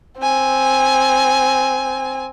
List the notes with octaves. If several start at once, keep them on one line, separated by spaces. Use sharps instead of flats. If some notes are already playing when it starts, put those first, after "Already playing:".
C4 G#5